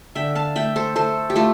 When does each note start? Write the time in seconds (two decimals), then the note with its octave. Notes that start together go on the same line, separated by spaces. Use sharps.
0.15 D3 E5 G5
0.35 F5 A5
0.56 A3 E5 G5
0.76 A4 C5
0.95 A3 A4 C5
1.30 G4
1.35 A3 F4 A4